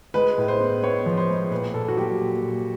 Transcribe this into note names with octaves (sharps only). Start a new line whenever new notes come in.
G#3 B4
A2
C5
B3
B3 C#5
F3
C5
G#3
A#2 B4
A#2 A4
F#4
F#3 G4
A#2
A#2